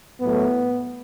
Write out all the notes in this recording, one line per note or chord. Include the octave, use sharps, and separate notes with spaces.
A2 F#3 A3 B3